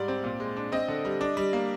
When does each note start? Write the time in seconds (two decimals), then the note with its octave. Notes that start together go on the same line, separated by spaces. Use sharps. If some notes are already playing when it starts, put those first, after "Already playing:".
Already playing: G#2 G3 D5
0.08 C4
0.24 A#2
0.40 G#3
0.57 D4
0.72 C4 D#5
0.88 D3
1.05 G3
1.21 D4
1.37 G3
1.53 A#3